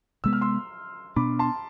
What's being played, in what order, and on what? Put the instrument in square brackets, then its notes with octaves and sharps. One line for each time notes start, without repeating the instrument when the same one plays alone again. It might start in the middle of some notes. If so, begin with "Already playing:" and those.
[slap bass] C3 G#3 B3 [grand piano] E6
[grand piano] F6
C6 E6
[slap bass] B2 B3 D4 [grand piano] B5 D6
[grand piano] A5 C6